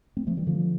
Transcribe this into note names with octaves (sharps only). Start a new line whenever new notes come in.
A3 C4
F3 A3
E3 G3
D3 F3